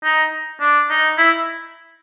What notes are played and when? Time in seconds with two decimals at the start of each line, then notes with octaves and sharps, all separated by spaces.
0.04 D#4
0.60 D4
0.90 D#4
1.18 E4